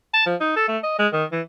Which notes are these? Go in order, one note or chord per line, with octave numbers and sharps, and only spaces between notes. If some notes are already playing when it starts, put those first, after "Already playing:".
A5
F3
D#4
A4
A3
D#5
G#3
D#3
E3